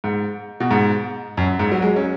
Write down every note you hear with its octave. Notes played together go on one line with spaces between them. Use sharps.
G#2
B2
G#2
F#2
G#2
F#3
G#3
C#4